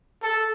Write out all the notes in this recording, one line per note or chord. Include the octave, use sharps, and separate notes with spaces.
A4